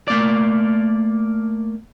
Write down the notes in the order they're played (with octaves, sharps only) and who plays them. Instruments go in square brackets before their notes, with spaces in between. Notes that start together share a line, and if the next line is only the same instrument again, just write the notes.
[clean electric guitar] A3 A#3 D5